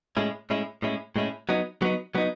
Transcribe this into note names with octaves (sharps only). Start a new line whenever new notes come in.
A2 G#3 C#4 E4
A2 G#3 C#4 E4
A2 G#3 C#4 E4
A2 G#3 C#4 E4
F#3 B3 D#4
F#3 B3 D#4
F#3 B3 D#4